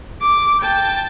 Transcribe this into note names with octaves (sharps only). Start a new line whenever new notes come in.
D6
G5 A5